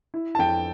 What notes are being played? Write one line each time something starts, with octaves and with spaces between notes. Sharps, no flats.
E4
A5
F2 G5